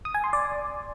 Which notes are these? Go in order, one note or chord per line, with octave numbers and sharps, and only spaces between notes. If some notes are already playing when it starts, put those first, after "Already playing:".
D#6
G#5
C6
D5